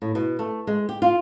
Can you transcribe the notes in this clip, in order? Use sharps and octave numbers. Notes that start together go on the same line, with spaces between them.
A2
B2
A3
G#3
G4
F4